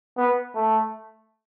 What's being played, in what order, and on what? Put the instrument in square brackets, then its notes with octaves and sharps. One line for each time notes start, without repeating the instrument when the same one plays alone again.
[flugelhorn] B3
A3